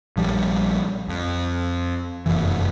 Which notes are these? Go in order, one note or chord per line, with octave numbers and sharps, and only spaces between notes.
A#1 F3 G3
F2
F1 F#2 E3